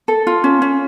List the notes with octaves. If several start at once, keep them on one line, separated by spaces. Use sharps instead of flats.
A4
F4
C#4
C#4